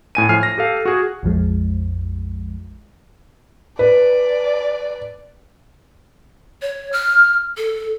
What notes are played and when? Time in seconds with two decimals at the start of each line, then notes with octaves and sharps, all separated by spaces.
0.15 A2 G#5 D#7
0.29 A2 F3 G#5 F6 C7
0.43 A#6
0.58 G4 A4 F5
0.85 F#4 G#4
1.23 A#1 F2 F3 G#3
3.79 B4 D5
6.62 C#5
6.93 F6
7.57 A4